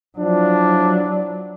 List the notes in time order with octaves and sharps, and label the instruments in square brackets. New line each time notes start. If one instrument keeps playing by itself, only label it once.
[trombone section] F3 D4 E4 [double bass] F#3